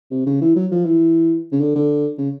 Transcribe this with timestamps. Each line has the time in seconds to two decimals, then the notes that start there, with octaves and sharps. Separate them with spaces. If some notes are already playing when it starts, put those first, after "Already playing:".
0.11 C3
0.26 C#3
0.41 E3
0.56 F#3
0.71 F3
0.85 E3
1.52 C#3
1.60 D3
1.75 D3
2.18 C#3